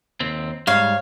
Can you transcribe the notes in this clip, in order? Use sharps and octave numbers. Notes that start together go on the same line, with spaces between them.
D#2 C4
G#2 G3 C#5 F5